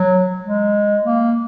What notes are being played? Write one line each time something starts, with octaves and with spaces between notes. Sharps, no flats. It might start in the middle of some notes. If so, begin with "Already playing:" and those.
Already playing: F#3
G#3
A#3